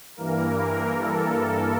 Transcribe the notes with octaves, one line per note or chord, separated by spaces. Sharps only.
G2 E3 A#3 A#4
A4